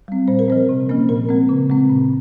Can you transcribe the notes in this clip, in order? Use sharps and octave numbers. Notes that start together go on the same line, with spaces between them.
G3 C4
A#2 C5
A#4
F3 C4 C5
C3
F3 A#3 C#4
A#2 A#4
G#3 C4
C#3
G#3 C4
A#2